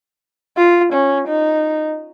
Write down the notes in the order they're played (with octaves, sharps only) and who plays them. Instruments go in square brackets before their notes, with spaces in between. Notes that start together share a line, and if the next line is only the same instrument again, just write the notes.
[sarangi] F4
C#4
D#4